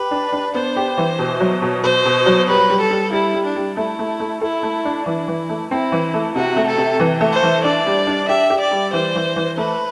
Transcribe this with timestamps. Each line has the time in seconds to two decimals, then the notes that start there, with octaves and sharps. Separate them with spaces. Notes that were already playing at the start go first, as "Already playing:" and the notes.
Already playing: G4 B4
0.11 D4
0.32 D4
0.54 B3 C5
0.76 G4
0.98 E3
1.19 B2
1.40 F#3
1.62 B2
1.83 B2 C5
2.05 B2
2.26 F#3
2.48 G3 B4
2.70 G3
2.81 A4
2.90 G3
3.12 G3 E4
3.34 G3
3.45 D4
3.56 G3
3.77 A3 E4
3.99 A3
4.20 A3
4.41 E4 A4
4.63 A3
4.85 D4
5.06 E3 E4
5.28 E3
5.49 A3
5.70 C4 E4
5.92 E3
6.14 A3
6.35 C3 F#4
6.56 A3
6.67 A4
6.78 C3
7.00 E3
7.21 A3
7.32 C5
7.43 E3
7.64 D4 D5
7.86 G3
8.07 D4
8.28 G4 E5
8.50 G4
8.61 D5
8.71 G3
8.93 E3 C5
9.15 E3
9.36 E3
9.57 A3 B4